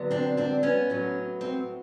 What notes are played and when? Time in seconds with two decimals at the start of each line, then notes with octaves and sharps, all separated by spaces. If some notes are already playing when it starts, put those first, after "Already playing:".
Already playing: D3 F#3 B3
0.11 C4 D4
0.37 C4 D4
0.63 B3 C#4
0.90 A2 F#3 B3
1.41 C4